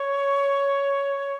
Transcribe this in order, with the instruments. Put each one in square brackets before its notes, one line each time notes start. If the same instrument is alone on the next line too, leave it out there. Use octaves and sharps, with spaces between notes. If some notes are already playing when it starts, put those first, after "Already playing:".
Already playing: [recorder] C#5